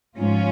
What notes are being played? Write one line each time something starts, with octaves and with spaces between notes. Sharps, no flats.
G#2 F3 C#4 F4